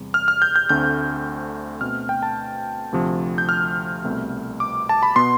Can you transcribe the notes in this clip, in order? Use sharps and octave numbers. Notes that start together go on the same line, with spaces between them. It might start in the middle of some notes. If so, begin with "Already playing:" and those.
Already playing: E2 C3 G3
F6
F6
G6
G6
D2 D3 A3 C4 G6
B2 A3 C4 F6
G5
A5
D2 C3 F3
G6
F6
C2 B2 A3 C4
D6
A5
B5
B2 B3 C6